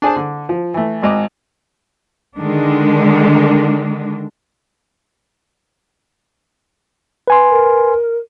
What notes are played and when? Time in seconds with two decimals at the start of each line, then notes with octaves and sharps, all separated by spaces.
0.02 D4 G#4 C5 A5
0.16 D3
0.49 F3
0.74 E3 A3
1.03 G#1 G#2 D#5 D6
2.35 D3 D#3 G#3 D4
7.28 B4 G#5 C6
7.50 A#4